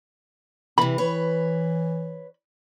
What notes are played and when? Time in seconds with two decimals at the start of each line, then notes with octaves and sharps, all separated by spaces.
0.78 C3 E3 B5
0.98 E3 B4 C#5